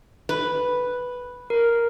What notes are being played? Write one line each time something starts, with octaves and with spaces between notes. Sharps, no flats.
B4
A#4